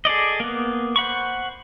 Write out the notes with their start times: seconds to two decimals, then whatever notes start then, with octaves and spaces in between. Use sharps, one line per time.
0.05 G#4 A4 D5 D#5
0.40 A#3 B3
0.96 C5 F#5 B5 C#6